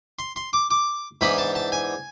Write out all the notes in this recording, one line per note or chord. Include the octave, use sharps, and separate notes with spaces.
C6
C6
D6
D6
G#2 E3 B3 D4 B5
A5
A5
G#5